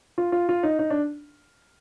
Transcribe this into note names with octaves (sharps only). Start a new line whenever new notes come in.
F4
F4
F4
D#4
D#4
D4